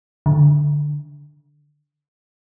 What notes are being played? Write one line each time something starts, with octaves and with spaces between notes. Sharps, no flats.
D3